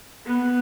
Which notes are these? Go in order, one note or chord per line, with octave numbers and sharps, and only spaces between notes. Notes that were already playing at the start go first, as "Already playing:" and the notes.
B3